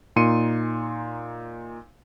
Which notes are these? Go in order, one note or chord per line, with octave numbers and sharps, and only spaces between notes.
A#2 D#4 C6 C#7 D#7